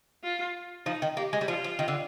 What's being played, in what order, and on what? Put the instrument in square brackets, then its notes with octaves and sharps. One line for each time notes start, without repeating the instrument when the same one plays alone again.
[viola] F4
[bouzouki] F3 [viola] D#4
[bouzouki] D#3
[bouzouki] A#3 [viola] G4
[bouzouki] G#3
G3
[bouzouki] F3 [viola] F4
[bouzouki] F3
D#3
D3